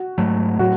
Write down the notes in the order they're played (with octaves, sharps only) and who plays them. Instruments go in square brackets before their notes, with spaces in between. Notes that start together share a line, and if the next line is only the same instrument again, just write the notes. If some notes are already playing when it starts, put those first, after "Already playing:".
Already playing: [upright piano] F#4
[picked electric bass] G#2 F#3 A3
[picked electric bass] A2 F#3 [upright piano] F#4